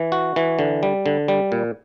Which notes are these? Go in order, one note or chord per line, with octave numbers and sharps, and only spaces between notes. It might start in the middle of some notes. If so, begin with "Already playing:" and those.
Already playing: E3
F#4
E3
D3
G3
D3
G3
A#2